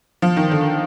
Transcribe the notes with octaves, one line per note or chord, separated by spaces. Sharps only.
F3
D#3
D3